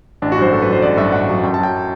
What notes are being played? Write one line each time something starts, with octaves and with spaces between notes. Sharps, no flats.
A1 D4
F#4
G2 F#3 C5
A1 A4
B4
G2 F#3
C5
A1 D5
G2 F#3 E5
A1 F#5
G2 F#3
F#2 G5
A5
F#3 G5